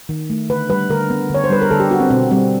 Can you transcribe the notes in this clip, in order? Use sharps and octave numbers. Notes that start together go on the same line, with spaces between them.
D#3
A3
D3 B4
G3 B4
D3 A#4
B3
D3 C#5
C5
G3 B4
A#4
D3 A4
G4
B3 F#4
C4
B2 C4
G3 C4